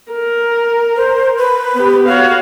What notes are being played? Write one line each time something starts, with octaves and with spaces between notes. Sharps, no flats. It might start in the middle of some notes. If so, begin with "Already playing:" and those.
A#4
C5
B4
B3 G4
F#4 C#5 F5